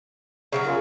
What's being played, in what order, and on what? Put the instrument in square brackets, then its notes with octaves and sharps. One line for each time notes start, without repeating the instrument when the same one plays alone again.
[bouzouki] C#3 F3 F#3
[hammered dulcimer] C#4 F4 A#4